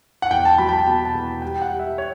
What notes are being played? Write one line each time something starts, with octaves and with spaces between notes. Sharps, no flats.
F#5
E2 G5
A5
F#3 B5
G5
A5
B2 A5
A5
E2
G3 G5
F#5
G3
E5
C#5